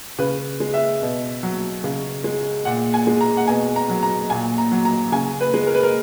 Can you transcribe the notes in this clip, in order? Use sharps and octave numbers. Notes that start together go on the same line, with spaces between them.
C#3 B4
G#3
E5
B2
F#3
C#3
G#3
A#2 F#5
G#5
G#3
A#5
F#5
B2 G#5
A#5
F#3
A#5
A#2 G#5
A#5
F#3
A#5
C#3 G#5
B4
G#3
A#4
B4
A#4